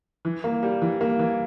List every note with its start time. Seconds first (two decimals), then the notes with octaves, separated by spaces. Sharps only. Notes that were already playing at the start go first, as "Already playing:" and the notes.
0.25 E3
0.44 A#3
0.63 G3
0.82 E3
1.01 A#3
1.19 E3